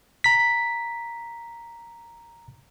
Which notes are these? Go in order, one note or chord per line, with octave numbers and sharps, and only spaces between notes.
A#5 B6